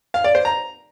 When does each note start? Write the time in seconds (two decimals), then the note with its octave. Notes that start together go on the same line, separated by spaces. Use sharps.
0.14 F5
0.24 D5
0.35 C5
0.45 A#5